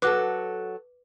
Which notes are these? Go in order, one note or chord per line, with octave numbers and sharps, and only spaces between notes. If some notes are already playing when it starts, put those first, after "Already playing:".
F#3 F#4 A4 B4 D6 F#6